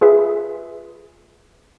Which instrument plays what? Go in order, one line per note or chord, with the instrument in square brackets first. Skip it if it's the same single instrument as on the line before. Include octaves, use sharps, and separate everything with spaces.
[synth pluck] F4 G#4 B4 E5